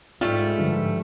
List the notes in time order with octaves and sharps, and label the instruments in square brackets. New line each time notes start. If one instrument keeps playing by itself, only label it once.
[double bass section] G#2 [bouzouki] G3 A3 [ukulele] F4
[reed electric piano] G2 D3 F3